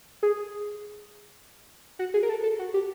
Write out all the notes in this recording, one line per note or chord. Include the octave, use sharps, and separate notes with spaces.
G#4
F#4
G#4
A#4
A4
A4
F#4
G4